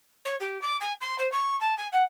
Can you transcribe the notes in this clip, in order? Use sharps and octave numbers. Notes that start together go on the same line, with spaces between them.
C#5
G4
D6
G#5
C6
C5
C#6
A5
G#5
F#5